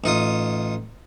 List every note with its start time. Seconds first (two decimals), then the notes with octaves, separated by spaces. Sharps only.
0.04 A1 D#4 F4 D#6